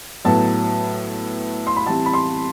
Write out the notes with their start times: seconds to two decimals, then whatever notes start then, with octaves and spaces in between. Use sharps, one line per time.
0.25 A2 F#3 B3 A5
1.67 C6
1.76 B5
1.86 E3 G3 C4 A5
2.06 B5
2.14 C6